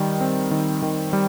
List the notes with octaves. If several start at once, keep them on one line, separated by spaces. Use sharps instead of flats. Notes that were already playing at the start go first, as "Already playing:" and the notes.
Already playing: D#3 G3
C4
D#3
D#3
G3